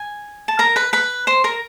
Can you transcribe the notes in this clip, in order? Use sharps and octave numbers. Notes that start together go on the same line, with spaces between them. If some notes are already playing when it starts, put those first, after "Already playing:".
Already playing: G#5
A5
A#4 A#5
B4 B5
B4 B5
C5 C6
A#4 A#5